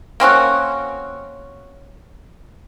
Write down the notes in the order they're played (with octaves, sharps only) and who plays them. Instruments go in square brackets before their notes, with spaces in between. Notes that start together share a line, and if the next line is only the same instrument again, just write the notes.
[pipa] A#3 C4 C#4 F#4